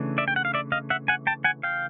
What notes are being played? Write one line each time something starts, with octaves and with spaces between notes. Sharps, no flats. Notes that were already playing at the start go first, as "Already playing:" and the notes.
Already playing: C#3 E3 A3 D4
D5 E5
G5
F#5
F5
D5 E5
D#5 F5
E5 F#5
F#5 G#5
G5 A5
F#5 G#5
F5 G5